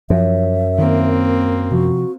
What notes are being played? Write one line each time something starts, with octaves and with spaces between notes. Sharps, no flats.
F#2 F3 E5
D#3 A#3 C4
C3 F3 F#4